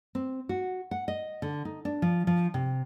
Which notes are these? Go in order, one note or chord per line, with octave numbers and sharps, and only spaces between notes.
C4
F#4
F#5
D#5
D3
D#4
D4
F3
F3
C3